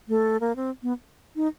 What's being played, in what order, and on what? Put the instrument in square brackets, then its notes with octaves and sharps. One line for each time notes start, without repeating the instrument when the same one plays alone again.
[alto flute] A3
A#3
C4
B3
D#4